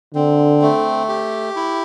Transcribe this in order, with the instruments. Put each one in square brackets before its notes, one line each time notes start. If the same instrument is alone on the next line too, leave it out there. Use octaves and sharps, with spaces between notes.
[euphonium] D3 [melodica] C4
[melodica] A3
G4
E4